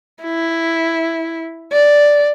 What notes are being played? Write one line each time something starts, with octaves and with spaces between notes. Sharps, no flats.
E4
D5